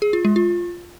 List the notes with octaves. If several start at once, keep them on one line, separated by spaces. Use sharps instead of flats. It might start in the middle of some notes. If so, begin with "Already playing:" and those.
G#4
F4
G#3
F4